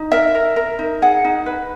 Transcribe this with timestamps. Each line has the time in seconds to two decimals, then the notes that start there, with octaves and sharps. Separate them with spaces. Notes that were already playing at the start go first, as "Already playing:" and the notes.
Already playing: D#4
0.12 A#4 E5
0.35 A#4
0.56 A#4
0.79 D#4
1.02 G#4 F#5
1.24 D#4
1.46 B4